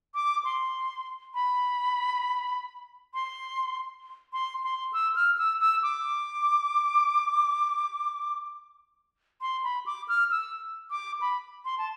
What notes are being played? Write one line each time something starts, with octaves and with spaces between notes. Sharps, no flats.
D6
C6
B5
C6
C6
C6
E6
F6
E6
E6
D6
C6
B5
D6
F6
E6
D6
B5
C6
A5